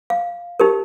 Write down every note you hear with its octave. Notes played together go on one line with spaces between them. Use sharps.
F5
D#4 G4 A#4